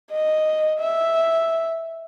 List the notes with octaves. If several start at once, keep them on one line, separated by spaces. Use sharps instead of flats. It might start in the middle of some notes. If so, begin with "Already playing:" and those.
D#5
E5